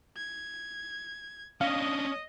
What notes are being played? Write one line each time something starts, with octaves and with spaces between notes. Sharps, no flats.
G#6
C#4 D4 D#5 F5 D#6